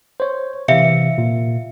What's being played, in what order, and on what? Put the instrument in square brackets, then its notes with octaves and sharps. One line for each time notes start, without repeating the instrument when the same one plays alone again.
[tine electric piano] C5 C#5
[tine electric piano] C3 E3 [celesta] E5 F5 C#7
[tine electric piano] A#2